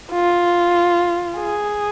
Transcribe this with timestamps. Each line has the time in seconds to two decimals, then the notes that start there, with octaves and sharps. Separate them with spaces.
0.11 F4
1.38 G#4